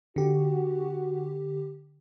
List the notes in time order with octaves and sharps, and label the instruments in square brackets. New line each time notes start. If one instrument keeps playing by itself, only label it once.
[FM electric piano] D3 G4 [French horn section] F#4